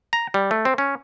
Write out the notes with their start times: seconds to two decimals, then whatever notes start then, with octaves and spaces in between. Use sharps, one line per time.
0.13 A#5
0.34 G3
0.51 A3
0.65 C4
0.78 C#4